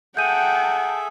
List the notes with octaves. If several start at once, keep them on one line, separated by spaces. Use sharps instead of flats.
G#4 A4 E5 F#5 G5 A5 G6 D#7